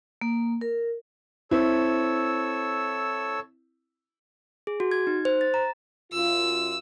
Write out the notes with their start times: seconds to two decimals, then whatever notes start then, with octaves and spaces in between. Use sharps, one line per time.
0.21 A#3
0.61 A#4
1.51 C4 E4 A4 C#5 E6
4.67 G#4
4.80 F#4
4.91 G#6
5.07 D#4
5.25 C5
5.41 A6
5.54 A#5
6.12 F#2 F4 E6